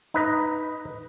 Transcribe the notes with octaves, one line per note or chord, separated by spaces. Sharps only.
D#4 B4 D#5